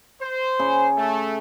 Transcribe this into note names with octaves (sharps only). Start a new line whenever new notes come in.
C5
C#3
A3